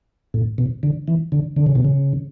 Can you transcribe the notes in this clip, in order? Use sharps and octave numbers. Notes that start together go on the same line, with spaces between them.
A2
B2
D3
E3
D3
D3
C#3
B2
C#3